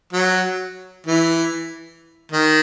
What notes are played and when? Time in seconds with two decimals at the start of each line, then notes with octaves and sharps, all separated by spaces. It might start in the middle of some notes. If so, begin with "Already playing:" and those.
0.13 F#3
1.07 E3
2.32 D#3